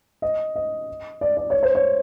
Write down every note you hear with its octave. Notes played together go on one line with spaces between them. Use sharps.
D#5
D#5
D5
D5
C#5
C5
C#5